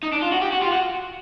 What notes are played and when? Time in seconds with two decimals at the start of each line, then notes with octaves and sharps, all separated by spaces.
0.03 D#4
0.12 D4
0.22 F4
0.32 F#4
0.42 G4
0.52 F#4
0.62 F4
0.72 F#4